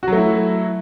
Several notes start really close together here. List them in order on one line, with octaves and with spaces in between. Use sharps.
F#4 F#3 A3 E4